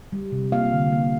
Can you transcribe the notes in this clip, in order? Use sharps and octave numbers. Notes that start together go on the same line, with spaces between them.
G3
C3
A#3 F5
D3
A#3